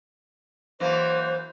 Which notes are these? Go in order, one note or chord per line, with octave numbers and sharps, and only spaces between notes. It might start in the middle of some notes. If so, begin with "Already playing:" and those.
F#2 E3 A#3 C5